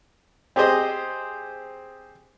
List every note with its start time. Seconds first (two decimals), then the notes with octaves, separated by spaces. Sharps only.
0.56 C4 G4 G#4 C5 D#5